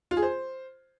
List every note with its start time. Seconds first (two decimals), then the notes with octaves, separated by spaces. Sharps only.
0.11 F4
0.17 G#4
0.23 C5